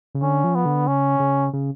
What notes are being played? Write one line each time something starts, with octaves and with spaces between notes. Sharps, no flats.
C#3
D3 C#4
F3
B3
D3
C#3 C#4
C#3
C#3